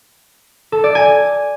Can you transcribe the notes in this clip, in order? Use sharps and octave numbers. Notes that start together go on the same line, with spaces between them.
A4
D5
G#5